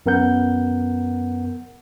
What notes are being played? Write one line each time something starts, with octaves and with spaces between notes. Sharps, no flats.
F#2 B3 A#4 F#5 G6